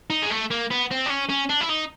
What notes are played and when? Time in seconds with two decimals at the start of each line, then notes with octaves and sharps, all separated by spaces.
0.10 D#4
0.22 G#3
0.30 A3
0.50 A#3
0.71 B3
0.91 C4
1.06 D4
1.10 C#4
1.30 C#4
1.50 D4
1.61 E4
1.70 D#4